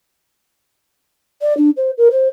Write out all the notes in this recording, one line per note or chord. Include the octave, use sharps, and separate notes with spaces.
D5
D4
C5
A#4
C5